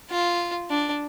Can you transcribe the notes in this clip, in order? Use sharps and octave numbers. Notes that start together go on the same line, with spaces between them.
F4
D4